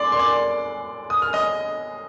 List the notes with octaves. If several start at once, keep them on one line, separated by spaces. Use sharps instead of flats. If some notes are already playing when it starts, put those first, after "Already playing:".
Already playing: D5 C6 D6
C6
D5 D6
D#6
F6
D#5 D#6